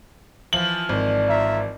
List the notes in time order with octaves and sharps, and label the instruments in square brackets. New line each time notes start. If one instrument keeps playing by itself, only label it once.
[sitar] E3 F3 [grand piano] F#7
[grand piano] G#1 [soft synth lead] D5
[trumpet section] F4 E5 A#5